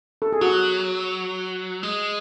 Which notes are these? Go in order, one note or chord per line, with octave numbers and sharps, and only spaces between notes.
A4
G#4
F#3 F#4
G#3